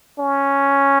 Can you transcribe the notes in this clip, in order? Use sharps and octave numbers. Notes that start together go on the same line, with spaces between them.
C#4